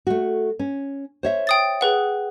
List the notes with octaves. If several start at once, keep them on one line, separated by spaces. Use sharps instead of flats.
A3 F#4
C#4
C5 C#5 E5
G5 D#6 A6
G#4 B4 F#5